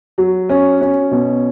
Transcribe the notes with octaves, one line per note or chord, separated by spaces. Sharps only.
F#3
C#4
C#4
B2